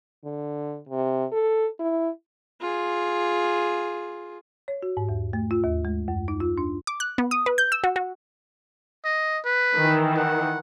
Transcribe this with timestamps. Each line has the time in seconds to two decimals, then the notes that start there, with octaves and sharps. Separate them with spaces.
0.24 D3
0.89 C3
1.32 A4
1.79 E4
2.61 F4 G#4
4.68 C#5
4.83 F#4
4.97 G#2
5.09 E2
5.33 A3
5.51 F4
5.64 D#2
5.85 G#3
6.08 F#2
6.28 D#4
6.40 F4
6.58 D4
6.87 D6
7.00 F#6
7.18 B3
7.31 D#6
7.46 B4
7.58 G6
7.72 E6
7.84 F#4
7.96 F#4
9.05 D#5
9.45 B4
9.76 D#3 E3
10.17 F#5